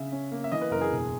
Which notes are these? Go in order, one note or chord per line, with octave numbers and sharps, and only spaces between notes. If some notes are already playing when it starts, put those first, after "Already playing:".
Already playing: C#3 E5
C#4
A#3
E5
E3 D#5
B4
F#1 A#4
G#4
E1